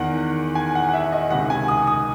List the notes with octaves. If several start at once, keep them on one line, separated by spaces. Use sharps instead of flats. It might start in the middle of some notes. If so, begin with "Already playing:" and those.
Already playing: E2 D#3 F#5
G#5
F#5
F#5
E5
D#5
C#2 C3 D#3 F#5
G#5
D#6
D#6